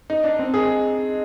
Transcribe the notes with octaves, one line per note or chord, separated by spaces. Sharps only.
D#4
D4
C4
G#4